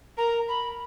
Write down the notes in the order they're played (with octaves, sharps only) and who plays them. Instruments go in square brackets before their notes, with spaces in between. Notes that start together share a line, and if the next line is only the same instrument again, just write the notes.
[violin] A#4 [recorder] A#5
[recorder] B5